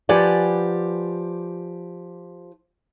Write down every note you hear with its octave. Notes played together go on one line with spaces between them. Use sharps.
F3 G4 B4 D5 F#5 G#5